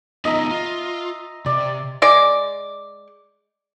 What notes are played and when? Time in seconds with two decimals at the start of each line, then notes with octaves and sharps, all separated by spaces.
0.25 B3 D#4 F4 D#5 E5 A#5
0.50 F4
1.46 C3 D5
2.02 G#3 D5